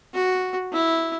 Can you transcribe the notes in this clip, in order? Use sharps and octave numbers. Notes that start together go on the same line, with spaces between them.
F#4
E4